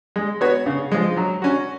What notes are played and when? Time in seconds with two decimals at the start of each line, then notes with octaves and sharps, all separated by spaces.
0.16 G#3
0.41 B3 F#4 C#5
0.66 C#3
0.92 F3 G#3
1.17 F#3
1.42 C#4 F#4